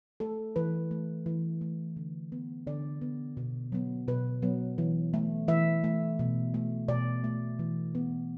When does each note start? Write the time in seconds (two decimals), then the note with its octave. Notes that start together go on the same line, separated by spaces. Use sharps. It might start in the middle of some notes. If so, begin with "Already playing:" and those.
0.20 A3 A4
0.56 E3 B4
0.91 A3
1.26 E3
1.61 A3
1.97 D3
2.32 B3
2.67 D3 D5
3.01 B3
3.37 B2
3.72 F#3 B3
4.08 B2 B4
4.42 F#3 B3
4.78 E3
5.14 A3
5.48 E3 E5
5.84 A3
6.19 B2
6.54 A3
6.89 B2 D5
7.24 A3
7.59 E3
7.95 B3